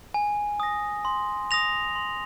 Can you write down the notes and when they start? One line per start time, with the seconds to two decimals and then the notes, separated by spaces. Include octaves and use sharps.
0.14 G#5
0.60 D#6 A#6
1.05 C6
1.51 D#6 A#6 F7
1.96 C6